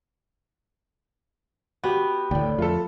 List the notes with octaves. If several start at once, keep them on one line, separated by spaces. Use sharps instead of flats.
B3 F#4 G4
D2 A2 D5 G5
F2 A3 F4 A4